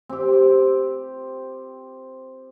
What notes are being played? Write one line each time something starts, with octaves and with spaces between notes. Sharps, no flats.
C4 G4